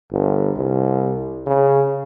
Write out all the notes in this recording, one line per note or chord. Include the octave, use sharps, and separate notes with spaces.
G1
C2
C#3